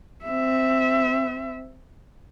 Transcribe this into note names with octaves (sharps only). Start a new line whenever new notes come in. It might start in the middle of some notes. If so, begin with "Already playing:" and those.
C4 E5